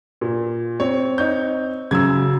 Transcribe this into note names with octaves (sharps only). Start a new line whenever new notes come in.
A#2
C4 C#5
D#4 C#5 G6
F#2 C#3 F#3 E6 G#6